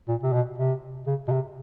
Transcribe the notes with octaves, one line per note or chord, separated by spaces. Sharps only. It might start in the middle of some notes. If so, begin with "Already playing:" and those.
A#2
C3
B2
C3
C#3
B2
C3